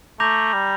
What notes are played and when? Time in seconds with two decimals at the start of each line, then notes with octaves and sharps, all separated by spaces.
0.20 A3 A#5 D6 G6 A#6 F7
0.53 G3